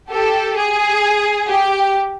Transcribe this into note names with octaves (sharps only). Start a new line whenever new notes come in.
G4 A4
G#4
G4